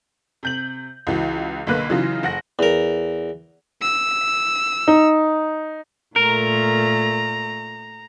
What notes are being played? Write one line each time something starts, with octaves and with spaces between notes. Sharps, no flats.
C3 G6 F#7
C#2 E3 F#4
B1 D3 A#3 B4 F#6
C#3 E3 F#3 D#4 F4
F#1 F#5 A#6
E2 A#4
E6
D#4
A#2 A3 A#4 A#5